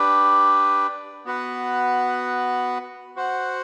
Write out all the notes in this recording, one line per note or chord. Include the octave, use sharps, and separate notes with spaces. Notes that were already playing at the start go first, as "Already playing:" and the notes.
Already playing: D4 G4 B4
B3 F#4 B4 F#5
F#4 C5 F#5